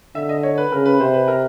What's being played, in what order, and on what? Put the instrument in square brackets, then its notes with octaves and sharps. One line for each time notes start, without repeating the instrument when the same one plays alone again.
[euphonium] D3 [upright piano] E5
[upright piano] D#5
C#5
B4
[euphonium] C#3 [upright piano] A#4
[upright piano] B4
[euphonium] C3 [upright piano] C5
[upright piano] B4
A#4